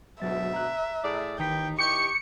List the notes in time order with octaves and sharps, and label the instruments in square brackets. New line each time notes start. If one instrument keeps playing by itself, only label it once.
[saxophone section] D2 G#2 B2 [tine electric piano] F#3 A6 [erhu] E5
[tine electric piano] A#5 F#6
[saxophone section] A2 G#4 D5
[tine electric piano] G#1 D#3 B6 [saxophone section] D#2 E3 D#4 [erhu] G5
[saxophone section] E3 D#4 G4 [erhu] C#6 [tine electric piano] D6 G6 [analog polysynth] C#7